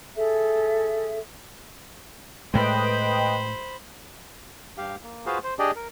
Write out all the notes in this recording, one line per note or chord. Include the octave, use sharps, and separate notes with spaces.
G#4 A4 E5
A2 G#3 B4 C5 D#5 G5 B5
G2 G4 F5
A#3
F4 F#4 G#4 B4 C5 F5
C5
D4 G4 G#4 D5 D#5
A#4